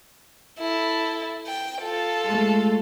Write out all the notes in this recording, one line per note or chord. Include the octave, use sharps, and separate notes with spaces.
E4 A4
G5
F4 A4
G#3 A3